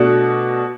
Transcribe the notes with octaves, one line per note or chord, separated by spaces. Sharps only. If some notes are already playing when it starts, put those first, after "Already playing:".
Already playing: B2 A3 D4 F#4